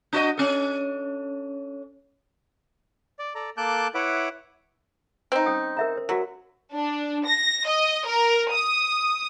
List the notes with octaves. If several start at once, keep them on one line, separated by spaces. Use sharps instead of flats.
D4 F#4 D#5
C#4 A4
D5
A4 D5 A#5
A#3 A4 A5 D6 F#6 G6
E4 B4 C#5 E5 F#5 D6
C4 D#4
C#4 G5 D#6
A#4 E5 A#5
C5
F#3 F#4 A#4
D4
A#6
D#5
A#4
D#6